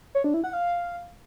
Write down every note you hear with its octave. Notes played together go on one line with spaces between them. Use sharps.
C#5
D4
E4
F#5
F5